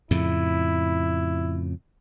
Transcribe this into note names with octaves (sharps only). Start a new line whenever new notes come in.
F2 A2 C#3 E4